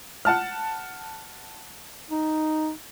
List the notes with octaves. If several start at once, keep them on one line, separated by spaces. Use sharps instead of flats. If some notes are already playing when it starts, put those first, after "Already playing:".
F#5 A5 F6
D#4